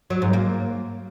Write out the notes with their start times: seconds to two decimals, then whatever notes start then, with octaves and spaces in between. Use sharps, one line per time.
0.10 F#3
0.22 G#2
0.33 A#3